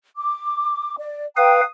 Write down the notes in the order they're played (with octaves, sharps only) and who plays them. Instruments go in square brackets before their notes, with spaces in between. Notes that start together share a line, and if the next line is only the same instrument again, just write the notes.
[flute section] D6
D5
[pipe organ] B4 F5 [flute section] G5 A#5 [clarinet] D#6